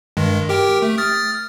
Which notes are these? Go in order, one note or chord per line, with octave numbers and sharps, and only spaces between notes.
G2 D#3 G#3
G4 A#4 G5
A3
D#6 F6 A6